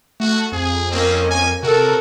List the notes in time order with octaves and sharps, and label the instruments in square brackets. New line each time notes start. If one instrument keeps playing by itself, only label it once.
[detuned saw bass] A3 [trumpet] F#4
[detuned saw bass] F2 [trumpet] G#4
[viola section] A#3 C#4 D#5 [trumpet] C4
[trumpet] G#5
[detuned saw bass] C3 [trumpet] F#4 [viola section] A4 A#4